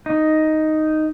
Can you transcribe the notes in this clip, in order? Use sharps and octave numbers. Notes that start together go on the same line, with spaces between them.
D#4